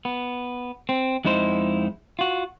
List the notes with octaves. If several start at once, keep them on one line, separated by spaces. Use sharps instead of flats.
B3
C4
F2 G#3 D#4 E4 C5
F4 F#4